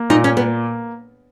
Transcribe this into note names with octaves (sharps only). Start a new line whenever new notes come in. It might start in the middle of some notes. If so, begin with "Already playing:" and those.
Already playing: A#3
A#2 D#4
C#4
A#3 B3